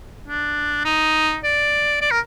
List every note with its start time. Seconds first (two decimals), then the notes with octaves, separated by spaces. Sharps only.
0.28 D4
0.85 D#4
1.44 D5
2.01 D5
2.11 A#4